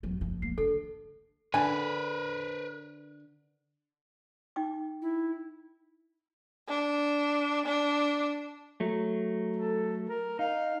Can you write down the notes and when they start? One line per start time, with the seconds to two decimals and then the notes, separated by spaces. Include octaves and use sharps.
0.03 E2 F#3
0.21 F#1 F3
0.42 A#3 C7
0.58 D3 A4
1.54 D3 A#4 B4 G#5
4.56 D#4 G5 D6
5.02 E4
6.68 D4
7.66 D4
8.80 F#3 A3
9.57 A4
10.09 A#4
10.39 D#4 F5